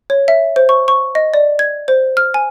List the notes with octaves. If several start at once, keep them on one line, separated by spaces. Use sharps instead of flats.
C#5
E5
C5
C#6
C#6
D#5
D5
G#6
C5
F6
G#5